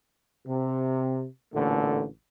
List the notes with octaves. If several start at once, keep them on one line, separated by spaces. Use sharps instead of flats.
C3
A1 A#2 D3 A3